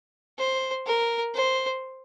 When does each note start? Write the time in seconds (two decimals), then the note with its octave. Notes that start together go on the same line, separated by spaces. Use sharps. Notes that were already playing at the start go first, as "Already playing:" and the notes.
0.39 C5
0.86 A#4
1.34 C5